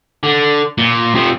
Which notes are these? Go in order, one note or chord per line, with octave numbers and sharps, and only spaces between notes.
D3
A#2
C3 F3